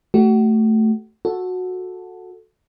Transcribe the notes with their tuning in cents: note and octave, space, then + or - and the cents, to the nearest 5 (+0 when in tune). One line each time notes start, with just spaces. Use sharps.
A3 +0 F#4 +35
F#4 -15 A4 +0